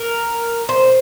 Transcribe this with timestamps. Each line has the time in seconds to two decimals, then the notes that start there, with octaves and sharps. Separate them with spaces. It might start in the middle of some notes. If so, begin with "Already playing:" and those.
Already playing: A#4
0.69 C5